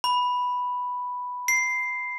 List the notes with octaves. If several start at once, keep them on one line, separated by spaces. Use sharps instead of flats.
B5
C7